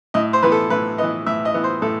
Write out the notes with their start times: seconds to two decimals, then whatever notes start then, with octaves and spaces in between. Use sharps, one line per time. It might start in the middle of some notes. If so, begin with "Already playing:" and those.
0.14 A2 D#5
0.33 C5
0.43 E3 B3 B4
0.52 A4
0.70 A2 B4
0.98 E3 B3 D#5
1.26 A2 E5
1.45 D#5
1.54 E3 B3
1.64 C5
1.82 A2 A4